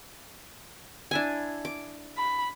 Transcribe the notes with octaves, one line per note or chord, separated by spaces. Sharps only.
D4 E4 G#5
D6
B5